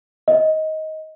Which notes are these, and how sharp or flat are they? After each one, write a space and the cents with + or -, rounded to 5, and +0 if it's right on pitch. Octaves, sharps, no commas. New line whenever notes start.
D#5 +15